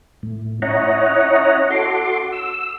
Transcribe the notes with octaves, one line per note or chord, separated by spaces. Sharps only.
A2
C#4 E4 C#5 D#5 F#5 A#5
F#4 A4 C6 D6
E6